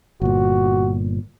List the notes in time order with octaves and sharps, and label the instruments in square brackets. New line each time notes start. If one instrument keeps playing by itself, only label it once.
[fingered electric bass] G1 A#2 [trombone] F#4